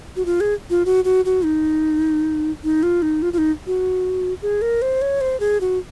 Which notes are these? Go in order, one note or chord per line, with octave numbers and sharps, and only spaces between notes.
F#4
F4
G#4
F4
F#4
F#4
F#4
D#4
D#4
F4
D#4
F4
F4
D#4
F#4
G#4
A#4
C5
C#5
C5
G#4
F#4